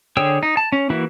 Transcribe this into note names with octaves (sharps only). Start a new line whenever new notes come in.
D3 G#4 C#5 G5 E6
D#4
A5
C#4
E3 A#3 E4 F#4